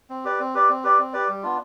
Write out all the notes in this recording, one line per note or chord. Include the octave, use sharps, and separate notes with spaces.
C4
G4 B4 D5
C4
G4 B4 D5
C4
G4 B4 D5
C4
G4 B4 D5
G3
B3 D4 F4